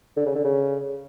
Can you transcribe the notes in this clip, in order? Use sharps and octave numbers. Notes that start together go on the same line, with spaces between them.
D3
C#3
D3
C#3